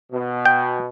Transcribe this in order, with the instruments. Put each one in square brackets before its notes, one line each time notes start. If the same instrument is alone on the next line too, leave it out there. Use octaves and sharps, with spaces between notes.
[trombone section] B2
[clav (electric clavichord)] G5